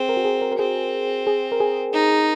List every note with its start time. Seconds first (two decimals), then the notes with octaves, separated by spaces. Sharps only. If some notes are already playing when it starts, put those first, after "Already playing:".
Already playing: C4 G#4
0.09 A#4
0.17 F#4
0.25 G#4
0.42 A#4
0.52 A#4
0.59 C4 G#4
1.27 G#4
1.52 A#4
1.60 G#4
1.93 D#4